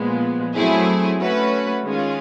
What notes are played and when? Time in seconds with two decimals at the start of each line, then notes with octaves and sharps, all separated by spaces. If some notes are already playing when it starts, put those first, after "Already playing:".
Already playing: A#2 F3 G#3 B3
0.55 F#3 A3 C4 E4 G#4
1.20 A3 C#4 F#4 B4
1.83 D#3 G#3 C#4 F4 G#4